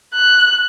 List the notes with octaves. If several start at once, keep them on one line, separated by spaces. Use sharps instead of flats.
F#6